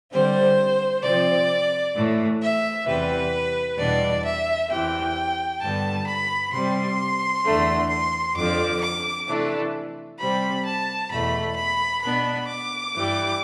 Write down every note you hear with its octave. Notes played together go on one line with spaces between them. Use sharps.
D3 G3 C4 C5
C3 F3 C4 D5
A2 E3 A3
E5
E2 C3 E3 G3 B4
E2 B2 G3 D4 D5
E5
E2 C3 E3 G5
G2 D3 G3 B3 A5
B5
C3 G3 C4 C6
E2 D3 A3
C6
F2 D3 F3 D6
D6
C3 E3 A3 D4
C3 G3 C4 B5
A5
E2 B2 A3 B5
B5
B2 B3 D4 B5
D6
G2 E3 G3